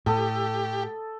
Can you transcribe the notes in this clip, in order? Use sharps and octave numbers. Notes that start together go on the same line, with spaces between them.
A2 G4 A4 D#6